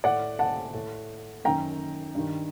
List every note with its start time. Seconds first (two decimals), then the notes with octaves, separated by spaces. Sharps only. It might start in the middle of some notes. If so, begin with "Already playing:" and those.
0.04 A2 D5 F#5
0.39 F#5 A5
0.74 A2
1.44 F#2 D#3 G5 A#5
2.15 G2 D#3